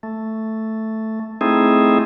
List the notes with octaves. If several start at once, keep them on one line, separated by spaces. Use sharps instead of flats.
A3
A3 C4 D#4 E4 G#4